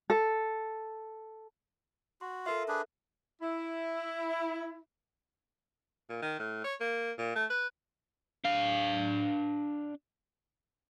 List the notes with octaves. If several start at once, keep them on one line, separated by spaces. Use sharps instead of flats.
A4
F#4 C6
F4 A4 A#4 E5 F5
D4 G#4 B4
E4
A#2
D#3
A2
C#5
A#3
A#2
A3
B4
D4 F5